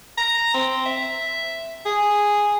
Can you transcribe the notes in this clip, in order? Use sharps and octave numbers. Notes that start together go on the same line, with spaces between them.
A#5
C4
E5
G#4